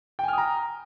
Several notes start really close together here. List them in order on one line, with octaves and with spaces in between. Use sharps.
G5 G#5 F6 D#6 A#5